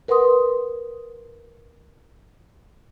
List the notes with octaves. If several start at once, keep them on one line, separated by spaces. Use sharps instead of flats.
A#4 B4 F#5 C6 D#6